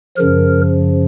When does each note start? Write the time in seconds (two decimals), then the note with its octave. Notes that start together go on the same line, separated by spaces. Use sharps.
0.17 F#2 C#3 F3 A#4